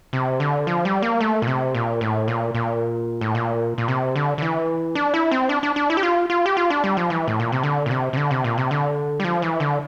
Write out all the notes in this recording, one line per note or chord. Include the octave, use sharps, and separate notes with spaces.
C3
D3
F3
G3
A#3
A3
A#2
C3
A#2
A2
A#2
A#2
A2
A#2
A#2
C3
D3
D3
E3
D4
E4
C4
D4
D4
D4
E4
G4
F4
F4
G4
F4
D4
G3
F3
E3
A2
A#2
C3
D3
A#2
C3
C3
D3
C3
A#2
C3
D3
G3
F3
E3
D3